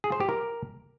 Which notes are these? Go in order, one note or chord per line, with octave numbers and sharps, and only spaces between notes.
G#4
C5
G4
A#4